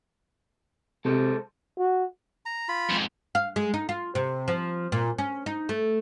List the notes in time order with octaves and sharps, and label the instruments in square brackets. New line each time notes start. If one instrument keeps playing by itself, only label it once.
[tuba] C3 [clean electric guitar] G#3 A4 C5
[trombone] F#4
[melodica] A#5
F4 B5
[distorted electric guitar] F2 G#2
[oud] F5
G#3
D#4
F4
C3
F3
A#2
C#4
D#4
A3